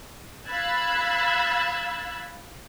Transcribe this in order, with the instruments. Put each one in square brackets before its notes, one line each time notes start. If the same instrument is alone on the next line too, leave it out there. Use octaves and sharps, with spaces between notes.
[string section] F5 B5 E6 F#6 G#6 A6